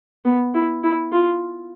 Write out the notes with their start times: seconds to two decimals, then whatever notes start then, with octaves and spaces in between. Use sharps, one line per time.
0.25 B3
0.54 E4
0.83 E4
1.12 F4